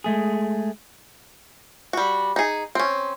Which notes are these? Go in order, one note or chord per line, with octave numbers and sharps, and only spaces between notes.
G#3 A3 G#4
G3 F#4
D#4 G#4
C4 C#4